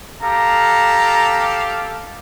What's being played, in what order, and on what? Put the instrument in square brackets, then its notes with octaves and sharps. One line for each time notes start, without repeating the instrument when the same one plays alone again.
[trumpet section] G4 A4 F5 [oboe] A#5